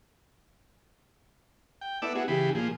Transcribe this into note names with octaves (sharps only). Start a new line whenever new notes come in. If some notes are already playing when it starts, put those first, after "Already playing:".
G5
B3 E4 A4 D5 D6 E6
B3 E4 F#4 G#4
C#3 E3 G4 G#4 B5
A#2 F3 G#4